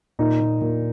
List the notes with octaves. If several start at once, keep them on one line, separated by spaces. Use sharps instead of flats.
A#2 D#4
A#2
A#2